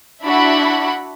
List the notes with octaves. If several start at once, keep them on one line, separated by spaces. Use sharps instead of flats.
D4 E4 F#4 F#5 B5